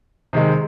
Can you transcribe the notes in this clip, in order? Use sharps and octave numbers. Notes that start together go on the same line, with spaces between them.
C3 D#3 G#3